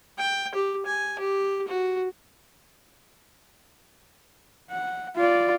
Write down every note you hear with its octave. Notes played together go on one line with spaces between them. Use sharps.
G5
G4
G#5
G4
F#4
F#5
F4 D5